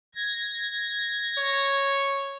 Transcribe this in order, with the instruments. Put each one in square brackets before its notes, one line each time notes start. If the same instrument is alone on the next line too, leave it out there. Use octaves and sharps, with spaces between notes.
[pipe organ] G#6 A#6
[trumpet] C#5